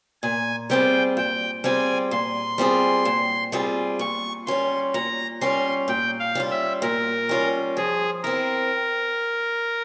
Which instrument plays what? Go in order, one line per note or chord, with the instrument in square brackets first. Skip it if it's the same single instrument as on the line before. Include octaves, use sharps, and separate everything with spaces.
[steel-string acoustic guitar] A#2 [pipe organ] G#5
[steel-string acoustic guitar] G3 C4 F4 G#4 [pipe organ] G5
[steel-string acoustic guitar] A#2 [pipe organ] G5
[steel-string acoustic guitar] G3 C4 F4 G#4 [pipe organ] G#5
[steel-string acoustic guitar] A#2 [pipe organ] C6
[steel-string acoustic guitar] G3 C4 F4 G#4
A#2
G3 C4 F4 G#4
[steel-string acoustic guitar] A#2 [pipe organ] C#6
[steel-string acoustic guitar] G3 C#4 F4 [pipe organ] C6
[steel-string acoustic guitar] A#2 [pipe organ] A#5
[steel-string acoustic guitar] G3 C#4 F4 [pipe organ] C6
[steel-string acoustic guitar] A#2 [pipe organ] G5
[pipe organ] F5
[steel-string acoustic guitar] G3 C#4 F4
[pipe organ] E5
[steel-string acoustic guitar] A#2 [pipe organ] A#4
[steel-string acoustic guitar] G3 C#4 F4
[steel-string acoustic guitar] F3 [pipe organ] G#4
[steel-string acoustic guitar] C4 E4 [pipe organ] A#4